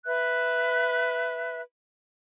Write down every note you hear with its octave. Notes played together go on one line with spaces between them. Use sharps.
B4 E5 F#6